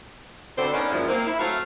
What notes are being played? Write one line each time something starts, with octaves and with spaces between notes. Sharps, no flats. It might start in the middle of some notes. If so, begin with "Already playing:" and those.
D2 B2 D3 C4 A4 C5
B3 C#4 D#4 A#4 D5
F#2 A#2 F3 G#3 E4
A#3 C4 E4
E4
F#3 A3 C4 F5